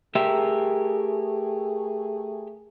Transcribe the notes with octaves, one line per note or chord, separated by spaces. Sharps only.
A3 G4 G#4 A#4 E5